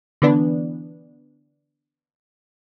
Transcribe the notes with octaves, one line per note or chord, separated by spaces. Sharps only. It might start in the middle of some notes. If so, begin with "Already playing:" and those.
D3 E3 B3 D4